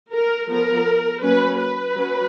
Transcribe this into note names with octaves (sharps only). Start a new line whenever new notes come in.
A#4
F3 B3 A#4
F#3 A#3 C#4 B4
B4
F#3 C#4